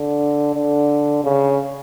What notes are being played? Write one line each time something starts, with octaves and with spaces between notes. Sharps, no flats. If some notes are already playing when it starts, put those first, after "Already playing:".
Already playing: D3
D3
C#3